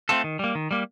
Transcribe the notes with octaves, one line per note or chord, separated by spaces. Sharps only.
A3 C4 F4 A4
D#3
G3 A#3
D#3
G3 A#3